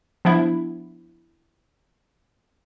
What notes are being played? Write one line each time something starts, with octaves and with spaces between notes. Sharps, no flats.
F3 B3 D4 E4 E5